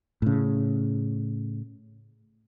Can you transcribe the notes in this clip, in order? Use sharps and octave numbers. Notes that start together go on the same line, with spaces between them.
A2 C#3